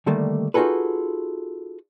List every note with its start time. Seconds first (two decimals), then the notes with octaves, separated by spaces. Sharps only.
0.06 D3 D#3 G3 A3 A#3
0.54 D#4 F4 F#4 G#4 A4 B4